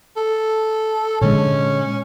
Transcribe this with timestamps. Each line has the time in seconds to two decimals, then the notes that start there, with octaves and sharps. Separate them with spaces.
0.16 A4
1.21 A#2 D3 G#3 C#4